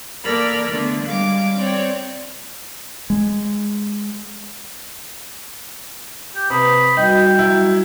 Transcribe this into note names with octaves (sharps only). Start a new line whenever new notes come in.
A#3 A4 A#4 D5 B5 F6
D3 A3 B3 D4
G3 G#3 D4 F5 D6
C4 C#5 D5 G5
G#3
G4
C3 B4 B5 D#6
G3 D#4 F#4 G5
F#3 E4